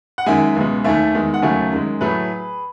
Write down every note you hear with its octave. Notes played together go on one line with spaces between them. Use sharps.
F#5
F#2 D#3 G#3 E5 G#5
C#2 B2 G#3
D#2 D#3 A3 E5 G#5
E2 D#3 G#3
F#5
D#2 C#3 F#3 A3 E5 G#5
F#2 D#3 G#3
A2 F#3 A3 G#4 B4